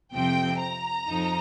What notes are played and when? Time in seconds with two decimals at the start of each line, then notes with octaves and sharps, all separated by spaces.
0.13 F2 C3 F3 C4 G5
0.60 A#5
1.08 F2 F3 D#4